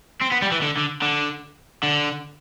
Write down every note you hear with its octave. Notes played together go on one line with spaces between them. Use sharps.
C4
B3
G3
E3
D3
D3
D3
D3